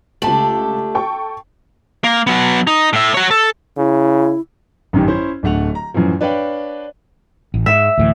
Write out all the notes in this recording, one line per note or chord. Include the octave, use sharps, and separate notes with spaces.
C#2 A3 D4 G4 A5 F#7
A4 G5 C#6
A#3
F#3 B3
D#4
A2 E5
F#4 C#5
A4
C#3 E4
A1 F#2 D#3 G4
C#4 E4 C5
D1 D3 A3 F#5 F7
A#5
F#2 A2 E3 F3
D4 B4 C#5 F5 G5
A1
G#2 E5
D2 A2 E3